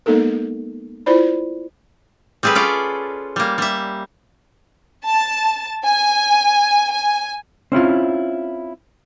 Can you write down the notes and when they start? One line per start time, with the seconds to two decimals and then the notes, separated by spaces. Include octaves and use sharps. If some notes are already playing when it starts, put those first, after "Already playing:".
0.06 G#3 A#3 B3 D#4 A4 A#4
1.06 E4 F4 C5 D5 B5
2.43 G3 C4 G#4 A4 B4
2.55 C#4 F4 D5
3.36 G3 A#3
3.58 G3 E5
5.05 A5
5.86 G#5
6.91 G#5
7.72 C4 C#4 E4 F4